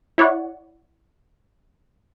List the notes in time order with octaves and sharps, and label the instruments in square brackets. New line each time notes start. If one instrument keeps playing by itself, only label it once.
[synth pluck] E4 C#5 D5 F#5